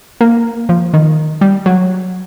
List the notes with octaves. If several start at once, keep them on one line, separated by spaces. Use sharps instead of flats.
A#3
F3
D#3
G3
F#3